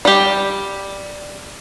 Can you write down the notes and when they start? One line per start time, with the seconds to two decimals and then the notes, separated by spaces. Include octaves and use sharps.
0.05 G3 G4